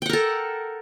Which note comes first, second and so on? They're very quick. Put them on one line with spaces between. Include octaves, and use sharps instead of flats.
G5 F#5 A#4 A4